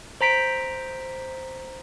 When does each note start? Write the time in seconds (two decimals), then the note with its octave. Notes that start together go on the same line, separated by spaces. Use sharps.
0.21 C5 A#5 B6 D7